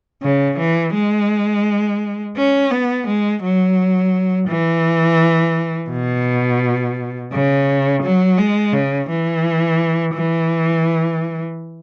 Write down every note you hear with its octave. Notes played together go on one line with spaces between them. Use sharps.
C#3
E3
G#3
C#4
B3
G#3
F#3
E3
B2
C#3
F#3
G#3
C#3
E3
E3